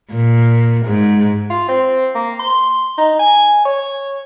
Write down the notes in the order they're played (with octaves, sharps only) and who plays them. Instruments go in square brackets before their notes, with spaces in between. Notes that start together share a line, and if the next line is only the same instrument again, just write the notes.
[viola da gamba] A#2
G#2
[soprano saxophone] F4
C4
A#3
C6
D#4
G#5
C#5